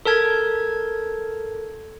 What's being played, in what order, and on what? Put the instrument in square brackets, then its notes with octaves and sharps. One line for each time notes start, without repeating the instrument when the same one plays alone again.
[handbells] A4 A#4 A5 G#6